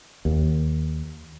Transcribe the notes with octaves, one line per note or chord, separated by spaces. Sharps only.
D#2